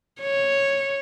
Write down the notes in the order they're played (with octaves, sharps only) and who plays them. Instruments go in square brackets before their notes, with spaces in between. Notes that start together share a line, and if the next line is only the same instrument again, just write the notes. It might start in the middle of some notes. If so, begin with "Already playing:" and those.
[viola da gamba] C#5